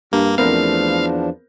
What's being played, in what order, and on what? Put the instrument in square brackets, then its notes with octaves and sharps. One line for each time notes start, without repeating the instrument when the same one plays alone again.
[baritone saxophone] G2 [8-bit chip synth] A#3
[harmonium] E2 F3 D4 [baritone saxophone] A3 [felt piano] B3 C4 A#4 [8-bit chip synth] F5